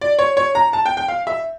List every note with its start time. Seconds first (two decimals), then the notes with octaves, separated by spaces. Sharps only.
0.01 D5
0.19 C#5
0.37 C#5
0.55 A#5
0.73 A5
0.86 G5
0.97 G5
1.08 F5
1.27 E5